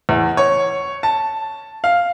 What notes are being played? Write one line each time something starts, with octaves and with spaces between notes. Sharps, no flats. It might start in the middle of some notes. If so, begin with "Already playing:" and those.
E2
C#5
A5
F5